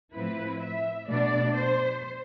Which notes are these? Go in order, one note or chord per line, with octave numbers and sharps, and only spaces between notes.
A2 F3 C4 E4 B4
E5
B2 A3 D4 D5
C5